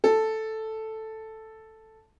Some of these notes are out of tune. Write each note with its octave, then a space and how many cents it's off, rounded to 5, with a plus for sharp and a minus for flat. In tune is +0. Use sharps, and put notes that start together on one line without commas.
A4 +0